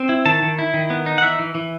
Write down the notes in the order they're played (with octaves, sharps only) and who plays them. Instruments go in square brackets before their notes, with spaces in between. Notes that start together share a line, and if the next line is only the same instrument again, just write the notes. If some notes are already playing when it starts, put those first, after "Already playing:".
Already playing: [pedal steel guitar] C4
E4
D#3 A5
D#3
E4
D#3
B3
D#4
F#5
E3 E5
E3
E3